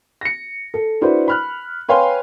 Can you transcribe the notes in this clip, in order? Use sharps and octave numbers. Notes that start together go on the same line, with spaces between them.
A#6 C#7
A4
D4 E4 F#4 B4 C5
B5 F6 F#6
B4 C#5 F5 G5 G#5 C6